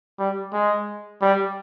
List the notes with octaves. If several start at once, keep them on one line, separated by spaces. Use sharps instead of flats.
G3
G#3
G3